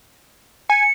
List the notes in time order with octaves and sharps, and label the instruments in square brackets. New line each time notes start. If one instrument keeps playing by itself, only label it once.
[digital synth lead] G#5 [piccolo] C#7